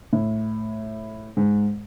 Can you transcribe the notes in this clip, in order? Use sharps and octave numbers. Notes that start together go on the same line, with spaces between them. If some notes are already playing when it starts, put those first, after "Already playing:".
A2
G#2